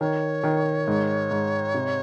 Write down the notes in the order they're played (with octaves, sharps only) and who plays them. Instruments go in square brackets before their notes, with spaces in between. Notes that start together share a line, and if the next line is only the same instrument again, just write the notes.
[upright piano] D#3 [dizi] C#5
[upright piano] D#3
G#2
G#2
C3